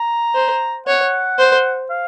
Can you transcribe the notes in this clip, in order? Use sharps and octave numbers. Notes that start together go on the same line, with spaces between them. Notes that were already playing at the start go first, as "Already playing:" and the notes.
Already playing: A#5
C5
C#5 F#5
C5
F5